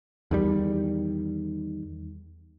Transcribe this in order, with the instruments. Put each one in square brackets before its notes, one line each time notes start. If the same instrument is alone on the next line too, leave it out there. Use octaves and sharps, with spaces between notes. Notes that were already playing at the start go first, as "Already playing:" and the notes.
[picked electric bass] E2 D#3 G3